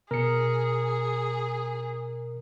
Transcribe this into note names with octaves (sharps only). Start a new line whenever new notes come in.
B2 G#4 A#4 C#7